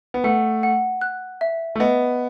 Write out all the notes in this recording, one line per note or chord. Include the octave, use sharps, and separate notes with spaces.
B3
A3 F#5
F#5
F#6
E5
A3
B3 D#5